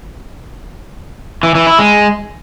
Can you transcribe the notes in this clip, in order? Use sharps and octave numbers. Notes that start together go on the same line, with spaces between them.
E3
E3
E4
G#3